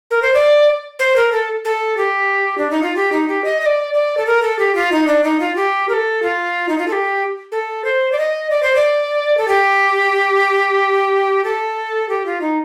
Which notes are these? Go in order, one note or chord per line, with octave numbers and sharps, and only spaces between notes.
A#4
C5
D5
C5
A#4
A4
A4
G4
D4
D#4
F4
G4
D#4
G4
D#5
D#5
D5
D5
A4
A#4
A4
G4
F4
D#4
D4
D#4
F4
G4
A#4
A4
F4
D#4
F4
A4
G4
A4
C5
D5
D#5
D5
C5
D5
A4
G4
A4
G4
F4
D#4